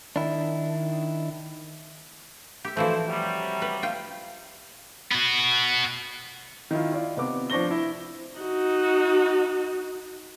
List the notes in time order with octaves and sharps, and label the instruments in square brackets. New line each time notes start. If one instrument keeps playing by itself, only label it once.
[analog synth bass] D#3 [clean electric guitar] D4 E4
[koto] G4 E5
[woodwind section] D2 E4 C5 [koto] E3 F3 A3
[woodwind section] C3 F#3 G3
[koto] B4
F4 G5
[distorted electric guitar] B3 F#4
[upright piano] D#3 E4 F4
E4 F4 D5
C3 B3 D6
F3 D4 C5 C#6 A#6 G7
E4
[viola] D#4 F#4